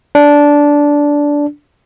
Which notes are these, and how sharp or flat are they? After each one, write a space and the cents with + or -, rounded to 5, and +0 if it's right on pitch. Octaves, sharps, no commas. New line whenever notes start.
D4 -10